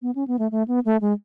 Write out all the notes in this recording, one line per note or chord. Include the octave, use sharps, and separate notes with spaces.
B3
C#4
B3
A3
A3
B3
A3
G#3